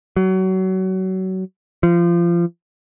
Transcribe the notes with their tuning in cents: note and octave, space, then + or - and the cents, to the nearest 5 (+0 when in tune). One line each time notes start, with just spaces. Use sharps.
F#3 +25
F3 -25